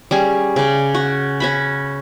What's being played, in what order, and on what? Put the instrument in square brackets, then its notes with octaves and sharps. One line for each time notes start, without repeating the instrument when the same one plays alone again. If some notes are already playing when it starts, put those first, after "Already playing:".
[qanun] G3 C#4 G#4
C#3 D5
F#4
C#4 F#4 B5